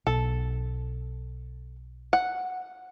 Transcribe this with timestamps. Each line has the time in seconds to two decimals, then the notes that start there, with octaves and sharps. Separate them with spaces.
0.07 B1 A4
2.13 F#5